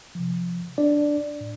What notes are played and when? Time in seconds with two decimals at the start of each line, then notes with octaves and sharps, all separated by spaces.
0.15 C3 F3
0.78 D4 D5
1.41 A2